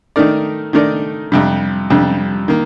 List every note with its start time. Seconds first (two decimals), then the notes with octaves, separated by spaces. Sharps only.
0.16 D#3 A3 D#4 A#4 D5
0.73 D#3 A3 D#4 A#4 D5
1.32 F2 C3 G3
1.90 F2 C3 G3
2.48 D#3 A#3